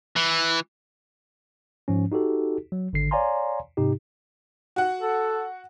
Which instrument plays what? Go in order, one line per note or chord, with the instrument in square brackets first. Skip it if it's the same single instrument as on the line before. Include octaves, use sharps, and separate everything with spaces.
[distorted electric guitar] E3
[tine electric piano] G#2 F3 C#4
D#4 F#4 G4 A4
F#3
G#1 D3 C7
C#5 D5 F5 G#5 A#5 C6
G#2 C3 D#4 G4
[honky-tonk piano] F#4 F#5
[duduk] A4